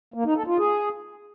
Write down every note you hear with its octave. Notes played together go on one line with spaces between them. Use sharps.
A#3
D#4
A4
F4
G#4